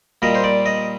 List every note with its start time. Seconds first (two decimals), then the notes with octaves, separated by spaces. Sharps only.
0.22 A#2 G3 D#5
0.35 C5
0.44 D5
0.66 D#5